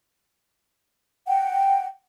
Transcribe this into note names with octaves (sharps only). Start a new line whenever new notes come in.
F#5 G5